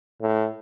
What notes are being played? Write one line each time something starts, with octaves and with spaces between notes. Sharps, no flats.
A2